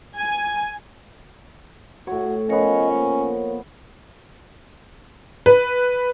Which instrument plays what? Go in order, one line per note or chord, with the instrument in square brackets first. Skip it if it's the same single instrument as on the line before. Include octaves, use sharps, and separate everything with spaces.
[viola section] G#5
[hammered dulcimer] A2 C#5 [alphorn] F#4
[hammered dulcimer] F3 B3 [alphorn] C#4 [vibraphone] A#4 C#5 [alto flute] D#5
[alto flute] A#3
[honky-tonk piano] B4